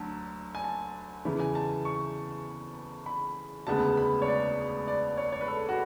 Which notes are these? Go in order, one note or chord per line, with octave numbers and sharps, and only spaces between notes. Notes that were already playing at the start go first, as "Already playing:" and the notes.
Already playing: D2 D3 F#3 A5
G#5
A5
E2 C#3 E3
G#5
A5
C#6
B5
E1 D2 C#3 G#3 B3 A5
B5
C#5
D5
D5
C#5
C#5
B4
A4
F#4